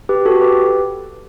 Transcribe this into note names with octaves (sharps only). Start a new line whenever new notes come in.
G4 B4
F#4 A4
G4 B4